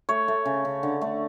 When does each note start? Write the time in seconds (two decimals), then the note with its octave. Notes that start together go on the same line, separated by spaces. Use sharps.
0.09 A3 C#5
0.28 A3
0.45 C#3
0.65 C#3
0.83 D3
1.01 A3